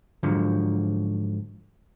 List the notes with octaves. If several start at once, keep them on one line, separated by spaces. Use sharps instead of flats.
G#2 D3 F3 F#3